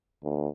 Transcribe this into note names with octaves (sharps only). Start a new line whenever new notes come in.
D2